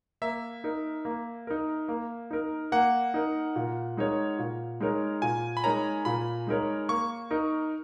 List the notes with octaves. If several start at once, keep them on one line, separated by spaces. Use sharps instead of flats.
A#3 E5
D#4 A#4
A#3
D#4 A#4
A#3
D#4 A#4
A#3 F#5
D#4 A#4
A#2
G#3 D#4 A#4 C#5
A#2
G#3 D#4 A#4 C#5
A#2 G#5
B5
G#3 D#4 A#4 C#5 A#5
A#2 B5
G#3 D#4 A#4 C#5
A#3 C#6
D#4 A#4